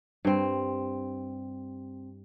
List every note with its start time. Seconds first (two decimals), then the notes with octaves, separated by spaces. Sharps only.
0.25 G2 C4